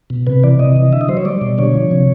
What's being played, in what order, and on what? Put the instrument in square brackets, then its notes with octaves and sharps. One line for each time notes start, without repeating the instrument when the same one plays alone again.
[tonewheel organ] B2
C3 B4
E3 D5
C3 D#5
E3
D3 E5
D#5
F#3 C5
C#5
G3 D5
B2
D3 C#5
F3
C3